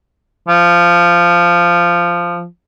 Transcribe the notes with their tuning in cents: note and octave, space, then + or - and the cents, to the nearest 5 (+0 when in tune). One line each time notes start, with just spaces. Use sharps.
F3 -10